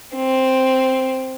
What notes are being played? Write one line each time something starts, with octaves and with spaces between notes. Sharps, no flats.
C4